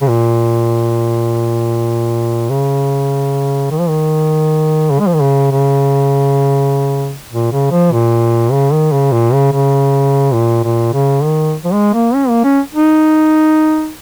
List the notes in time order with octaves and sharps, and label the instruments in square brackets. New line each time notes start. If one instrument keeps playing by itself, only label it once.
[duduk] C#3
A#2
C#3
D#3
F3
D#3
C#3
G#3
F3
D#3
C#3
C#3
A#2
C#3
F3
A#2
C#3
D#3
C#3
A#2
C#3
C#3
A#2
A#2
C#3
D#3
F3
G#3
A#3
C#4
A#3
C#4
D#4